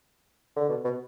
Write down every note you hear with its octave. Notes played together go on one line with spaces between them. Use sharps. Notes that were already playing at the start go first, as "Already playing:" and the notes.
D3
B2
B2